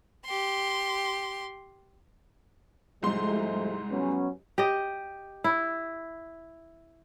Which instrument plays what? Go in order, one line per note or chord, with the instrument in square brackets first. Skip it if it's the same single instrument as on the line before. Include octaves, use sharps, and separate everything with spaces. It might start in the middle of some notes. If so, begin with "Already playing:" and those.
[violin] G4 C6
[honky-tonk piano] C2 G#2 C6 [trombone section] F3 G#3 A3
[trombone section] F#3 B3 C#4
[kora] G4 D#5
E4